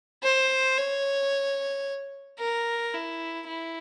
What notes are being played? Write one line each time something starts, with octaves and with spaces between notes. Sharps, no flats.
C5
C#5
A#4
E4
E4